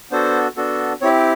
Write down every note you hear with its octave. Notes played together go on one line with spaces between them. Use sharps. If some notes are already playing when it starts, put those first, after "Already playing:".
B3 D4 F#4 A4 C5
B3 D4 F#4 A4
C4 E4 G4 C#5